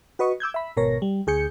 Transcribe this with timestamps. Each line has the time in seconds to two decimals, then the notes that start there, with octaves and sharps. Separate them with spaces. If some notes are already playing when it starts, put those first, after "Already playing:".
0.19 F#4 B4 D#5 C#6
0.40 D6 E6 G6 G#6
0.54 E5 B5
0.77 G#1 B2 A#4 C#5 A#6
1.02 G3
1.27 D2 G#4 G6 C#7